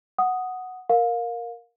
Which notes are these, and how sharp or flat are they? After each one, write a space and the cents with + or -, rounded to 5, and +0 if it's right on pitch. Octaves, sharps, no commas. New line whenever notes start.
F#5 +0 D#6 +0
A#4 +0 F5 +25